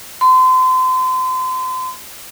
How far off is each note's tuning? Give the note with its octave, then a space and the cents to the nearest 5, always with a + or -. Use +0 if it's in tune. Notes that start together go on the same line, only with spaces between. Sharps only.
C6 -35